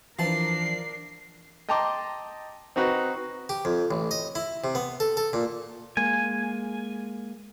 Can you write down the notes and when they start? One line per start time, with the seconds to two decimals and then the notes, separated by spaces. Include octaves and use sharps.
0.19 E3 F3 D4 A#4 A5 C7
1.69 D#5 G5 A5 A#5 C6 D6
2.76 C4 D#4 F#4 B4
3.49 G4
3.65 F2
3.91 A1
4.11 D#5
4.35 E4
4.64 C3
4.75 B3
5.00 A4
5.17 A4
5.33 A#2
5.97 G#3 A#3 G#5